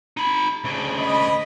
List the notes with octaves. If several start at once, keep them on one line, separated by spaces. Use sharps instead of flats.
D#4 B5
D2 C#3
D#5 B5